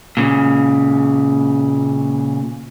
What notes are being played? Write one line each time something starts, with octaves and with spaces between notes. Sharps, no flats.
A#2 C#3